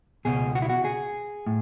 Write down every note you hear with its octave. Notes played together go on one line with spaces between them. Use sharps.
C#2 B2 G#4
F#4
E4
F#4
G#4
A2